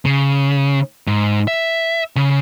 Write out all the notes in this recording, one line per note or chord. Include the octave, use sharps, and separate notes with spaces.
C#3
G#2
E5
C#3